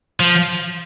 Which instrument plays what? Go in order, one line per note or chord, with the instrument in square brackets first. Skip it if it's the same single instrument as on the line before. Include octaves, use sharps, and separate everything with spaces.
[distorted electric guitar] F3